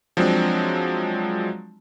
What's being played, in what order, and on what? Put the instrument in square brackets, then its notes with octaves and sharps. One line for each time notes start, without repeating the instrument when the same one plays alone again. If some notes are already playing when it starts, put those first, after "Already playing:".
[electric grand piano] F3 F#3 G#3 C4 D4